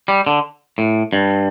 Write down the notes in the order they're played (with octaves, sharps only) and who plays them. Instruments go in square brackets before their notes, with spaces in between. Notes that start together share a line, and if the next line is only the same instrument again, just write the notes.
[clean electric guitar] G3
D3
A2
G2